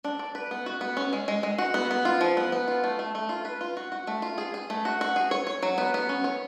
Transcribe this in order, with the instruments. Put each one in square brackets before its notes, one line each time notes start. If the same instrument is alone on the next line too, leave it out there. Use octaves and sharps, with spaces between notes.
[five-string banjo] D4
D5
B4
B3
F#4
B3
C#4
G#3
G#3
G#3
F#4
B3
B3
F4
F3
B3
B3
F4
A3
A3
A3
F4
B4
F4
F#4
F#4
A3
F4
G#4
G#4
A3
F#4
F#4
G#4
C#5
C#5
F#3
B3
B3
C#4
C#5